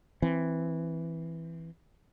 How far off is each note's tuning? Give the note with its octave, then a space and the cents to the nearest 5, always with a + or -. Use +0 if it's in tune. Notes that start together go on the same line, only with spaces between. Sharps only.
E3 +0 C4 +0